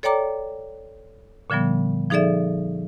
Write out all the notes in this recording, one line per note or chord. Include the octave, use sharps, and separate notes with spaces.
A4 C#5 D5 G5 A#5 D6
A#2 D3 F3 G3 B3
F3 D#4 G#4 A4 D5 E5